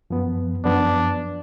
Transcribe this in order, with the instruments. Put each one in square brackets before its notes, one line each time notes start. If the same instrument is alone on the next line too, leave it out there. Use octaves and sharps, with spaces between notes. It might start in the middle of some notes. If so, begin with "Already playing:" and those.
[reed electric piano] F#2 F3 B3
[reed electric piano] F#2 F3 B3 [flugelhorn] D4